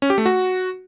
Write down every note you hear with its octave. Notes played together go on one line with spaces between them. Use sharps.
C#4
G4
A3
F#4